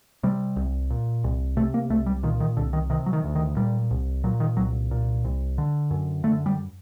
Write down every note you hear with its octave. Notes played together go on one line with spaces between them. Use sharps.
C3 G3
C2
A#2
C2
C3 A3
A#3
C2 A3
G3
A#2 D#3
D#3
C2 D3
D#3
C3 D#3
F#3
D#3
D2
D#3
A#2 G3
C2
A#2 F#3
D#3
C2 F#3
A#2
C2
D3
F#2
D3 A3
G3